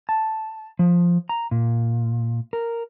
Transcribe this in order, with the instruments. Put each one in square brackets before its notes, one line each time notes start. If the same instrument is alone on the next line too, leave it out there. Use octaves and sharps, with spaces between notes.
[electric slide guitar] A5
F3
A#5
A#2
A#4